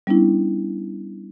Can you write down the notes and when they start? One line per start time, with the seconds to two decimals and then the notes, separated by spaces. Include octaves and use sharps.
0.07 G3 B3 C#4 D4 E4